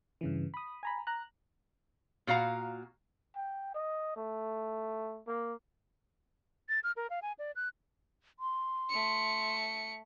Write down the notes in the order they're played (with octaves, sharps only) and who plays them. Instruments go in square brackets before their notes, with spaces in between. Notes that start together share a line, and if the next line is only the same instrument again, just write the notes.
[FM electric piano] G2 C#3 E3
B5 D#6
G#5 A#5 B5
A#5 F#6
[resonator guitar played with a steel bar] A#2 F#4 F5 A#5
[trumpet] G5
D#5
A3
A#3
[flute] A6
F6
A#4
F5
G#5
D5
F#6
[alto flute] C6
[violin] A3 C#7